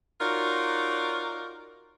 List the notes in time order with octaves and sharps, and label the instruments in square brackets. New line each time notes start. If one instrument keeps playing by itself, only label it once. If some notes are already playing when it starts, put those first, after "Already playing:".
[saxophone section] D#4 F4 F#4 A#4 C#5 D5